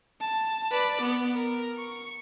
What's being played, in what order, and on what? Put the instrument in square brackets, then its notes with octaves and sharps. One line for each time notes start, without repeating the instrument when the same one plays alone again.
[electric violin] A5
B4 D5
B3
A#4
C#6